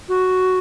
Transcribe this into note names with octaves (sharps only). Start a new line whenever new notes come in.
F#4